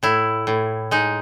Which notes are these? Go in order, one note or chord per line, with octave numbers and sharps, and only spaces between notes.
A2 E4
A2
G#3 D#4